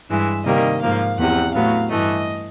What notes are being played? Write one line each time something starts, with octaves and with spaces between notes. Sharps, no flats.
G2 E3 G#3 E5
C3 D#3 G3 A#3 D#5
G#2 F3 A#3 F5
E2 C3 F3 F#5
A2 F#3 B3 F5
G2 E3 A3 D#5